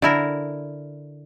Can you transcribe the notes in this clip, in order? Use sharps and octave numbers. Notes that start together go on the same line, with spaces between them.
D3 E4 A#4